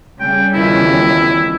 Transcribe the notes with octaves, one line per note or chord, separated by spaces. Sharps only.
C#3 G3 G5
E2 D#3 F3 E4